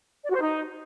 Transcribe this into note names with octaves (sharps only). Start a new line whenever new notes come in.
D5
F#4
C5
D#4